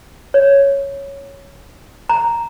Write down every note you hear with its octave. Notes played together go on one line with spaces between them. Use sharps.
C#5
A#5